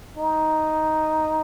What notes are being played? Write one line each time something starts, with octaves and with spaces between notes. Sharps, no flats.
D#4